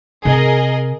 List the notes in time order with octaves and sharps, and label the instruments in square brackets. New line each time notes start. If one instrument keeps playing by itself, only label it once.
[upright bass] C3 [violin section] G#4 A#4 D#5